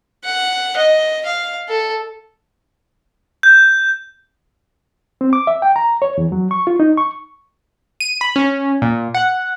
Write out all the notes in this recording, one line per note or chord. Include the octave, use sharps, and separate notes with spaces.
F#5
D#5
F5
A4
G6
C4
D6
E5
G5
A#5
C#5
E2
F#3
C#6
F4
D#4
C#6
D#7
B5
C#4
A#2
F#5